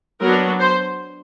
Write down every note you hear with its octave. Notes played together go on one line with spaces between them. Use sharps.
F#3 B3 D4 A#4
C5